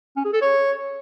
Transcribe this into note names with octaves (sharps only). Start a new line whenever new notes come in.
C#4
G#4
A4
C#5